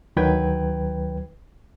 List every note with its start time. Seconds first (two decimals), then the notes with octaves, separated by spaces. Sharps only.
0.17 D2 D#3 F#3 B4 G5 G#6